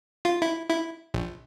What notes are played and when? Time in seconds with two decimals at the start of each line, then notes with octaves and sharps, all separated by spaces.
0.25 F4
0.42 E4
0.70 E4
1.14 A#1